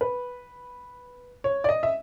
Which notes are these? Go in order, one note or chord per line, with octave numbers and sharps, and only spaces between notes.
B4
C#5
D5
D#5
E5